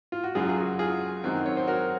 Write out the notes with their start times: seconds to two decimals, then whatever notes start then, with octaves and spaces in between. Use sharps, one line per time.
0.12 F4
0.24 F#4
0.35 F#2 C#3 F#3 F4 G#4
0.49 G#4
0.57 F#4
0.79 F4 G#4
1.24 F#2 D#3 F#3 C4
1.46 C#5
1.57 C5
1.67 F#4 A#4